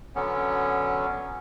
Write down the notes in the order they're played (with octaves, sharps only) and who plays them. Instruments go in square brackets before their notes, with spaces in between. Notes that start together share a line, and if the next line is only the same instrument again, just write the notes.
[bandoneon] D3 F#3 B3 C#4